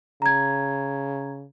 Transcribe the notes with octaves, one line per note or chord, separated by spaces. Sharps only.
C#3 A#5 G#6